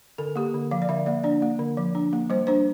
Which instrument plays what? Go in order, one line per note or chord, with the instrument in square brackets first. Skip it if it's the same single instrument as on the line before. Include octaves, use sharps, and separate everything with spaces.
[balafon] D3 A4
A#3 G4
D3
F3 F5
D5
D3 E5
A#3 D5
D4 D5
A#3
D3
F3
D4
A#3
G3 C5
D4 C5